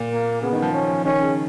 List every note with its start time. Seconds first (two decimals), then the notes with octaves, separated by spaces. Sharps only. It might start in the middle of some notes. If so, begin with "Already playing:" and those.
Already playing: A#2
0.10 A#3
0.42 C#3 B3
0.53 D#3
0.62 F3
0.73 C#4
1.05 D#3 C#4
1.21 C#3